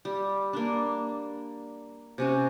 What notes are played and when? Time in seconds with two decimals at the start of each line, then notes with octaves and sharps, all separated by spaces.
0.05 G3
0.53 A#3 D4
2.18 C3 C#4 F#4